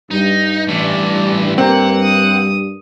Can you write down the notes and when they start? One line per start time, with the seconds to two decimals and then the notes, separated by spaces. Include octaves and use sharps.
0.11 G2 D#4
0.68 A2 E3 D5
1.58 A#3 C4 F#5
2.03 D#6